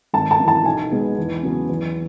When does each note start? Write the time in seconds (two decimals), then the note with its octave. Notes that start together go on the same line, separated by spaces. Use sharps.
0.13 G#1 A5
0.31 A5
0.40 F#2 E3
0.48 A5
0.65 B1 G#5
0.92 B2 G#3 B3
1.18 E2
1.43 C#3 F#3 B3
1.69 E2